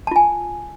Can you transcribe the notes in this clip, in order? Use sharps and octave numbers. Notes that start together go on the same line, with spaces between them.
F4 G#5 A5